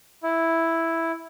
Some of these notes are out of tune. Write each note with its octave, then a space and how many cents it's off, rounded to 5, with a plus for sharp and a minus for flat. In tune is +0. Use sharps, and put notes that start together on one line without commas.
E4 +0